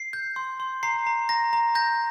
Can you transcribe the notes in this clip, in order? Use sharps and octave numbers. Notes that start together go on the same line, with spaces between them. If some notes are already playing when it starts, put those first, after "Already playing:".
Already playing: C7
G6
C6
C6
A#5 C7
A#5
A#5 A#6
A#5
G6 A#6